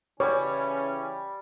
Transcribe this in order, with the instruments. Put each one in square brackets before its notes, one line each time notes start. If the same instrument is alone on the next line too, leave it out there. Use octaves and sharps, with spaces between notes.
[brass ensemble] C#3 E3 C#4 [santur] G3 [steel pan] C#5